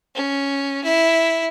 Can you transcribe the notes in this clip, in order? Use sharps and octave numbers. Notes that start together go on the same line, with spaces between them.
C#4
E4